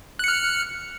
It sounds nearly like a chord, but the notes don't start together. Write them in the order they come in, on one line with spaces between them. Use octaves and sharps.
F#6 C#7 F6